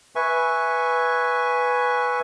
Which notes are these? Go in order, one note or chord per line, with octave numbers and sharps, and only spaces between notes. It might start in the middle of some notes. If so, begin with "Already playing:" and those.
B4 E5 G#5 C#6